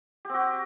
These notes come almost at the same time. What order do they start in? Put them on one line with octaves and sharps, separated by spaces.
G4 C4 F#4